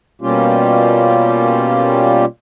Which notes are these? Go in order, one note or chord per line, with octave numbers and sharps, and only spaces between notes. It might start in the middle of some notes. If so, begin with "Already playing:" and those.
B2 G3 A#3 C#4 F4 G4